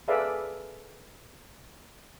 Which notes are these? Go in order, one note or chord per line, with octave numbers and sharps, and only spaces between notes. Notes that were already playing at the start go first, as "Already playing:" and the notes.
G#4 A4 B4 D5 E5 F5